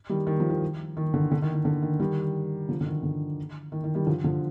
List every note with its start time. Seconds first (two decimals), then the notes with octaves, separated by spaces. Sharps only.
0.09 D#3 G3
0.27 D#3
0.40 F3
0.50 D#3
0.97 D#3
1.14 D3
1.31 D3
1.42 D#3
1.54 D#3
1.65 D3
1.82 D#3
1.99 D#3 G3
2.69 D3 F3
2.81 D3
2.86 D#3
3.03 D3
3.72 D#3
3.84 D#3
3.95 D#3 G3
4.07 D3 F3
4.24 D3 F3